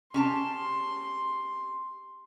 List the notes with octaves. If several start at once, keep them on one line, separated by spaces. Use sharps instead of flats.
C#4 G4 A5 C6